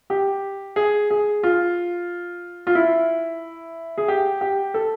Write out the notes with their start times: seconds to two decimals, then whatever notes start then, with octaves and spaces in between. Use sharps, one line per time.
0.10 G4
0.76 G#4
1.10 G#4
1.43 F4
2.67 F4
2.75 E4
3.98 G#4
4.08 G4
4.41 G4
4.74 A4